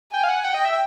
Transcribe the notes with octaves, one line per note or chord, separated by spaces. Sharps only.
G5 G#5
F5
F#5
F#5 G5
D#5
E5